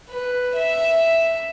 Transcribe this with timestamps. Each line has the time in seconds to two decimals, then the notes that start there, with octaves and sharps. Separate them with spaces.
0.10 B4
0.56 E5